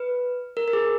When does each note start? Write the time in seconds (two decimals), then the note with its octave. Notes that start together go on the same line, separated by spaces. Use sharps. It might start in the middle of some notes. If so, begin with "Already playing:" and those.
Already playing: B4
0.57 A#4
0.68 A#4
0.73 G#4